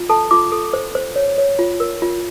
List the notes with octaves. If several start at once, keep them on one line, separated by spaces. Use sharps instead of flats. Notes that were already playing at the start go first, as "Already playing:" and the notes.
Already playing: F4
A4 A5
F4 D6
A4
C5
C5
C#5
C#5
F4
A#4
F4